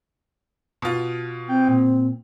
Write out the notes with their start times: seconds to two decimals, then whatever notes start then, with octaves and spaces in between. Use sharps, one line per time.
0.82 B2 F4
1.48 C4 G5
1.68 A#2